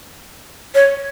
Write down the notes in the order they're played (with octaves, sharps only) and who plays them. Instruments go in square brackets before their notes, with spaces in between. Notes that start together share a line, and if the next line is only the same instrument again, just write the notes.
[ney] C#5